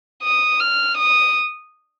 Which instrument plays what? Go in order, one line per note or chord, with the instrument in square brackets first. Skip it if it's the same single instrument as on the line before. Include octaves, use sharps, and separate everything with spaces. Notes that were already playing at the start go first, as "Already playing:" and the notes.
[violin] D#6
F6
D#6